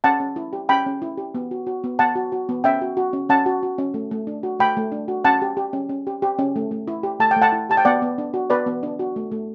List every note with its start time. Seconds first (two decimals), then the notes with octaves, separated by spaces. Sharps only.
0.04 C#4 F#5 A5
0.20 C#4
0.36 E4
0.53 G4
0.69 C#4 G5 B5
0.86 C#4
1.02 E4
1.17 G4
1.34 B3
1.51 F#4
1.66 F#4
1.84 B3
1.99 B3 F#5 A5
2.15 F#4
2.32 F#4
2.49 B3
2.64 C#4 E5 G5
2.81 F#4
2.97 F#4
3.13 C#4
3.29 C#4 F#5 A5
3.46 F#4
3.63 F#4
3.78 C#4
3.94 A3
4.11 A3
4.27 D4
4.43 F#4
4.59 A3 G5 B5
4.77 A3
4.92 D4
5.08 F#4
5.24 C#4 F#5 A5
5.42 G4
5.57 G4
5.73 C#4
5.89 C#4
6.07 G4
6.22 G4
6.39 C#4
6.56 A3
6.71 A3
6.88 E4
7.03 G4
7.20 A3 A5
7.31 G5
7.36 A3
7.42 F#5 A5
7.52 E4
7.70 G4 A5
7.77 G5
7.85 B3 D5 F#5
8.02 B3
8.18 D4
8.34 F#4
8.50 B3 B4 D5
8.66 B3
8.83 D4
8.99 F#4
9.16 A3
9.32 A3